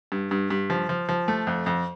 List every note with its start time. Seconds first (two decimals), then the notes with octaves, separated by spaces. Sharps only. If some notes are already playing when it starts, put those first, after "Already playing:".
0.12 G2
0.31 G2
0.50 G2
0.70 F3
0.89 F3
1.09 F3
1.28 A3
1.47 F2
1.66 F2